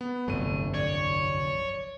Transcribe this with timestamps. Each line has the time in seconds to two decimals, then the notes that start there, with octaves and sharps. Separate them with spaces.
0.01 B3
0.28 G1 C2 F2 F#3 A3 D#7
0.74 C#5 D5